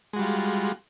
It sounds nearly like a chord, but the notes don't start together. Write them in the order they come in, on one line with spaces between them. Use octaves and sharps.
G#3 F#4 G3 F4